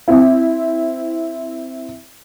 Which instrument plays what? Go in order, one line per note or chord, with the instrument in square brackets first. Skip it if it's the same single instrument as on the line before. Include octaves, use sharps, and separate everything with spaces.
[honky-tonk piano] C4 E4